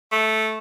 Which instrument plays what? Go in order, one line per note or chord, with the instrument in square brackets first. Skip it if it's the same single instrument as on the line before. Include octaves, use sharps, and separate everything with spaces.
[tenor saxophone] A3